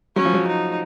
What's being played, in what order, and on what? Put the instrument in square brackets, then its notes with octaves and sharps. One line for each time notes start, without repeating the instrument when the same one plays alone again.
[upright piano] F#3 [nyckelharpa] C#4
[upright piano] F3
F#3
[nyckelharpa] D#4